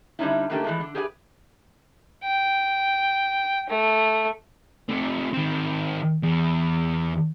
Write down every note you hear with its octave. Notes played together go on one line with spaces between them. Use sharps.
D3 G3 A#3 C#4 D#4 E4
G#2 C#3 A3 A#3 D4 G4
E3 F3 G#3 A3
D3
G4 G#4 B4 D5 F#5 G#5
G5
A3
C3 A3
D#3 C4
E2